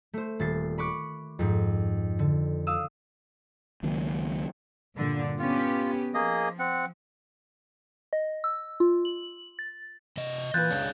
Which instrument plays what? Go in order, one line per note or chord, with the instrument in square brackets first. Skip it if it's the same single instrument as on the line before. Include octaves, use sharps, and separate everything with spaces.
[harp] A3 C5
D#1 A6 C7
B5 C#6 D6 F#6
F2 G#2
D3
F5 D#6 E6
[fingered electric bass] C#2 D#3 F#3 A#3
[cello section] G2 A#2 D3
[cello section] B3 C#4 G4 [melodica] F4
[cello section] F3 [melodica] A#3 G#4 D#5
[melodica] C4 F#5
[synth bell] D#5
E6
F4
F#7
A6
[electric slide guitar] C3 D#5
[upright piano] A#2 B4 [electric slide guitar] E3 [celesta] F#6 G6 A6
[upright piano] C#2 [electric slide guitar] D4 G#4 C#5